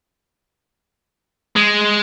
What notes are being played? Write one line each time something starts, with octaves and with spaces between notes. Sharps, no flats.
G#3